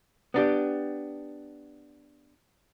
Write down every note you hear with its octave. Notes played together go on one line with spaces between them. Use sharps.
B3 D4 G4